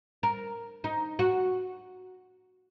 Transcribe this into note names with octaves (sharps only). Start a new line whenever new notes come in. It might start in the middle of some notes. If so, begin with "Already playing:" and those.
A#4
D#4
F#4